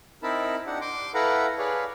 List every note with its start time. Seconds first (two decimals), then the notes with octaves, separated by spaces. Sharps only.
0.23 C4 D#4 E4 A#4 A5 B5
0.66 D4 D#4 G4 F#5
0.81 C6 D6
1.14 E4 A4 B4 F5 F#5 A#5
1.58 G#4 B4 C#5 D5 F5